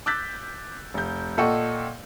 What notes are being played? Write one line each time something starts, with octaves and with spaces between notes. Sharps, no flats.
D6 E6 F#6 G6 A6 B6
F1 G6
A#2 A4 D#5 F#5 G5 C#6